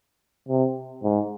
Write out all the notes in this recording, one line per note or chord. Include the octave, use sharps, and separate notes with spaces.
C3
G#2